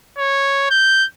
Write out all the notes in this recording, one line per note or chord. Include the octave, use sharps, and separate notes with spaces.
C#5
G6